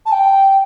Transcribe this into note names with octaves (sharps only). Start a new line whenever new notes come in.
A5
G5